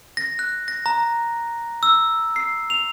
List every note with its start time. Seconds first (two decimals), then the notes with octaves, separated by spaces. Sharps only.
0.17 A#6
0.39 F#6
0.68 A#6
0.86 A#5
1.83 E6
2.36 C7
2.70 F7